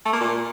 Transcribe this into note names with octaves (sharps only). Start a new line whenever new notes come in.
A3
A#3
A#2